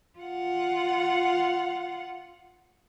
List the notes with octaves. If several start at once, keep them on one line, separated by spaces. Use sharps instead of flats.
F4 F#5